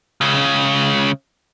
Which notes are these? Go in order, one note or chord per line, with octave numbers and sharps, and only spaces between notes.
C#2 C#3